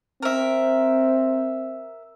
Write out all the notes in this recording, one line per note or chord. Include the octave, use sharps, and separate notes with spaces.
C4 A#4 E5